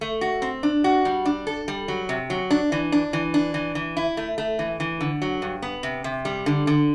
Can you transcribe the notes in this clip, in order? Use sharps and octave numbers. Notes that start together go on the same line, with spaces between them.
A3
F#4
C4
D4
F#4
G3
D4
A4
G3
F#3
C3
F#3
D4
E3
D4
E3
D4
E3
E3
E4
A3
A3
E3
E3
D3
F#3
G2
B3
C3
C3
G3
D3
D3